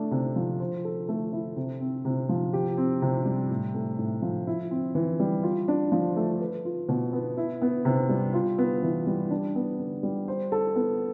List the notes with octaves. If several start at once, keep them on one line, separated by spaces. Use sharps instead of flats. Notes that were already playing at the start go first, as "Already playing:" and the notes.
Already playing: A3 D4
C3
F3
C5
A4
A3
E4
C3
C4
C3
F3
G4
C4
C3
G3
A2
A3
A2
F3
E4
C4
E3
G3
F4
D4
F3
A3
B4
F4
B2
B3
E4
B3
C3
G3
F4
B3
E3
G3
D4
B3
D3
G3
C5
A4
B3